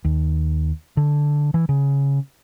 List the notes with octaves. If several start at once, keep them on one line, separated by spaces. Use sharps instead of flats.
D#2
D3
E3
C#3